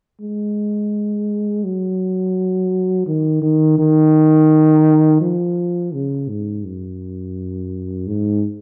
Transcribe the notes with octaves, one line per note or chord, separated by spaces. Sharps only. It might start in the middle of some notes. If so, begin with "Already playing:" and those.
G#3
F#3
D#3
D#3
D#3
F3
C#3
G#2
F#2
G#2